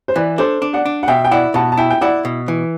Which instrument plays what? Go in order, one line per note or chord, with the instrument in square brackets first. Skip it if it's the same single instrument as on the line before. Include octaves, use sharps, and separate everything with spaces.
[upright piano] C5
[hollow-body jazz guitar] E3 [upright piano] B4 D5
[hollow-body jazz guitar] D4 [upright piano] A4 C5
[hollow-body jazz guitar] D4
[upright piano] D5 F#5
[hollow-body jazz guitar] D4
[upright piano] F#5
[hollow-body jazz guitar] B2 [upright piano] E5 G5
[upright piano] G5
[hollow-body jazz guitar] E4 [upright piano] D5 F#5
[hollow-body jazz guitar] B2 [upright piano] F#5 A5
[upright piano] A5
[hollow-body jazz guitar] E4 [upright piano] E5 G5
[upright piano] G5
[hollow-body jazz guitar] E4 [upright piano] D5 F#5
[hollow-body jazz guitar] B2
E3